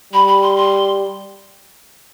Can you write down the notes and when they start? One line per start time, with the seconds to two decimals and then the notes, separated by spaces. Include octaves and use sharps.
0.13 G3 B5
0.27 B5
0.42 C6
0.56 C6